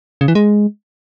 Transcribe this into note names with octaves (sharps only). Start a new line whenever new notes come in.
C#3
E3
G#3